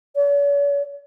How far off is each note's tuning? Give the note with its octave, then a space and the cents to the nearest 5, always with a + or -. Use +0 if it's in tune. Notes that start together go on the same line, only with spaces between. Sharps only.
C#5 +45